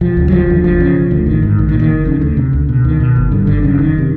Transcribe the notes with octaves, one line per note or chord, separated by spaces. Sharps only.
E1 F3
D2 C#3
F#3
F1 F3
D#2 D3
F#1 F3
E2 C#3
E1
D2 D3
A1 D#3
G#2
A#1 D#3
D#3
A#2
D#3
F#1
F2 C#3
D2 D3
C3
C#2
B2
C#2 D#3
B2
G1
G2 D3
G1 D3
F#2 C#3
F1 D#3
C3